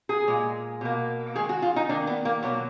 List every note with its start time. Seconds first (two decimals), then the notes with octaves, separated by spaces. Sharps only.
0.09 G#4
0.28 A#2 G#3
0.81 B2 A#3
1.36 D#3 G#3 G#4
1.49 F#4
1.62 F4
1.76 D#4
1.89 D#3 A#3 D4
2.07 B3
2.25 A#3
2.43 B2 F#3 A#3 B3